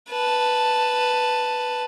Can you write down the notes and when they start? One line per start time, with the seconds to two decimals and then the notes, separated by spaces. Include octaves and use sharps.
0.10 B4 A5